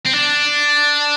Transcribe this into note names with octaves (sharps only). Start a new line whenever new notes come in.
C4
D4